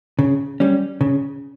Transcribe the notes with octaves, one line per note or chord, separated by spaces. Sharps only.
C#3
G3 C#4
C#3